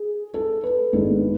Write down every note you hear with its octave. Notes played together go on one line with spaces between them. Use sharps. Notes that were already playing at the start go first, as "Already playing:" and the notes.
Already playing: G#4
A4
B4
G#1 G#2 G#3 B3 D4